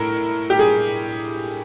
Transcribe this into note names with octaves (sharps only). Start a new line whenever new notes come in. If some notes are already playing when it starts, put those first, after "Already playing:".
Already playing: A2 A#4
G4
G#4